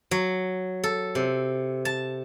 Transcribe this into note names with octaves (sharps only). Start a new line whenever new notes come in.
F#3
A4
C3
A5